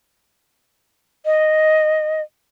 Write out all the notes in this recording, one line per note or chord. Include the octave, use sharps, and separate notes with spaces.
D#5